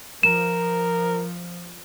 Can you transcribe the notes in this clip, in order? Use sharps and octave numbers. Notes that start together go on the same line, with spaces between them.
F3 A#4 E7